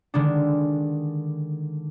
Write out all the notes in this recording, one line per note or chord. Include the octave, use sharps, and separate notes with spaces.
D3 D#3 G#3 D4